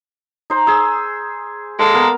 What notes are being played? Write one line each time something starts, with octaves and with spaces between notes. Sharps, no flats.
D#4 C5
G#4 E6
G#3 A#3 A4
B3 A#4